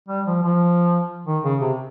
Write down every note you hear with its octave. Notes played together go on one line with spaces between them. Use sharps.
G3
F3
F3
D#3
C#3
C3